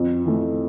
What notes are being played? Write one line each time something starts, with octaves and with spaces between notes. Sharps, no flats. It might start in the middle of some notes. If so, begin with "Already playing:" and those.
Already playing: F2
E3 A3